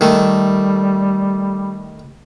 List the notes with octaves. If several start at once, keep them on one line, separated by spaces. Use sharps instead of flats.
D#3 G3 A3